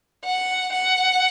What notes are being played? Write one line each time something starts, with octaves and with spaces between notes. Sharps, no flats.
F#5
F#5